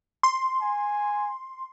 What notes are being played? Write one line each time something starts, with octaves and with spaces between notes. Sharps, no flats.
C6
G#5